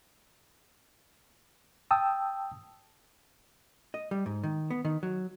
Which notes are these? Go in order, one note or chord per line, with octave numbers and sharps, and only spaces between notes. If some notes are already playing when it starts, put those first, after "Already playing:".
G5 A5 D#6 E6
D#5
G3
G#2
D#3
B3
D#3
F#3